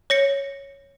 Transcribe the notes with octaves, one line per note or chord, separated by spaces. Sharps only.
C#5 A#6 C#7